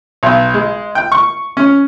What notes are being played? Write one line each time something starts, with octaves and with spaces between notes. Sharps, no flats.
B1
G#3
G5
C#6
C#4